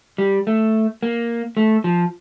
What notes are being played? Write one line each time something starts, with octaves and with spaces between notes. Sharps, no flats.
G3
A3
A#3
A3
F3